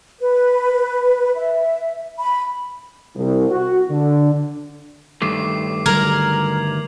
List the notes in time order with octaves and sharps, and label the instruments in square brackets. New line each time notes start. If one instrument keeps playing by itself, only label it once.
[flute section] B4
E5
B5
[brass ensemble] C2
F#4
D3
[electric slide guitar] G2 D#3 A3 [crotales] D6 C7
[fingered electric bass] D3 F#3 G3 [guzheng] A#4 [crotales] G#6 F7 F#7